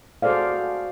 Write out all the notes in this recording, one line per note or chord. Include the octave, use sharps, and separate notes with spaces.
F#4 G#4 A4 C5 D5 F5